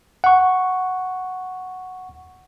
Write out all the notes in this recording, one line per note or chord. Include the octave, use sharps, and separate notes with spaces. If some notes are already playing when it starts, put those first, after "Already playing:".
F#5 C#6